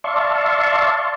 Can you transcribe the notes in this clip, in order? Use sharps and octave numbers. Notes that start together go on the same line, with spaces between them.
D5 E5 F5 A5 C6 C#6